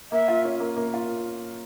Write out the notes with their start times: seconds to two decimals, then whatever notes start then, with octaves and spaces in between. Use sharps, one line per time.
0.12 A#3 E5
0.28 F4
0.45 C#4
0.60 A#3
0.76 A#3
0.94 F4